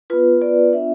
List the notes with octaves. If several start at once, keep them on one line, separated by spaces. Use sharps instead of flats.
B3 F4 B4
D5
B3 D4 F4 E5